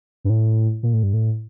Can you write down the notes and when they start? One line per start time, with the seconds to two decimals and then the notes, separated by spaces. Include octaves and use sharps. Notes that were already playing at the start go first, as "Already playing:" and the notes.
0.24 G2
0.30 A2
0.83 A#2
0.93 A2
1.03 G2
1.13 A2